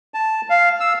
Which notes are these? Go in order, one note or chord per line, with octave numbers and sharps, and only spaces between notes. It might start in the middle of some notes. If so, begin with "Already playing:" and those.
A5
F5
E6